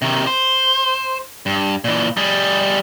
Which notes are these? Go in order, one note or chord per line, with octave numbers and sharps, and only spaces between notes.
C3 D#3
C5
G2
A#2 E3
G3 G#4